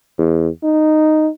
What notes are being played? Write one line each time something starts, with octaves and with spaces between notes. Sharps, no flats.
E2
D#4